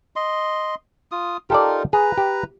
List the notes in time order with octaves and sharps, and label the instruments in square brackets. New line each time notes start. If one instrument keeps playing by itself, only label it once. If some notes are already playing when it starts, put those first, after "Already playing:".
[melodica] D#5 C6
F4 D#6
[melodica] D#4 F4 A#4 [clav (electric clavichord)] G4 A4 D5
[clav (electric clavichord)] G#4 [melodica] B4 A#5
[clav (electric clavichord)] G4